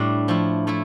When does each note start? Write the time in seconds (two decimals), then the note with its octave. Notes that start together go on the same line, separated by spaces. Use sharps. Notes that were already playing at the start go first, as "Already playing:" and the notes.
Already playing: A2 G3 D4
0.28 F3 A3 E4
0.67 F3 A3 E4